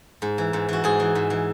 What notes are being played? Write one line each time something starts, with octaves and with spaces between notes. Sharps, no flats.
G#2
E3
G#2
E3 F#4
G#2 G#4
E3
G#2
E3